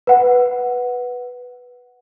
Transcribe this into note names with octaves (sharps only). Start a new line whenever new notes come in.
B4 F#5